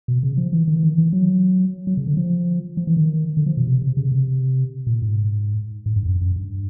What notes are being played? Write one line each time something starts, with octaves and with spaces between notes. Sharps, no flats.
B2
C#3
F3
E3
D#3
E3
D#3
E3
F#3
F#3
C#3
D3
F3
F3
E3
D#3
D3
F3
B2
C3
C3
C#3
C3
A#2
G#2
G#2
G2
F#2
F#2
G2